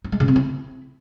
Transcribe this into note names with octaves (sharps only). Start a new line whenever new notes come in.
D#4
G#3
C#3
C4
E4